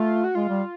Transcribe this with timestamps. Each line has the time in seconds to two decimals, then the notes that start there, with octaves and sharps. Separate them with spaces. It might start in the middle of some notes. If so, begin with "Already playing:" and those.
Already playing: A3 F4
0.24 F#4
0.35 G#3 F4
0.49 G3